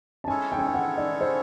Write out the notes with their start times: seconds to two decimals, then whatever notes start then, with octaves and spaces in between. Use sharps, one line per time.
0.24 A5
0.28 G#3 C#4 E4 A4 C#5 G#5
0.52 G5
0.59 G#5
0.66 G5
0.74 F#5
0.97 D5
1.21 C5